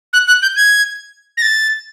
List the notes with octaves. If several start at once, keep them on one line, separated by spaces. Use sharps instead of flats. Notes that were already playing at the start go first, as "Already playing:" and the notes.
F#6
F#6
G6
G#6
A#6
A6